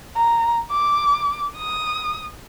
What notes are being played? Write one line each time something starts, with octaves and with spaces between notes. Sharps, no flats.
A#5
D6
D#6